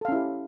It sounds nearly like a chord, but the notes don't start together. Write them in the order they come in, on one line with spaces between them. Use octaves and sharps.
A4 F5 C#4 E4 G4